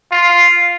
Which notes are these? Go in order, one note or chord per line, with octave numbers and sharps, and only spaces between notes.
F4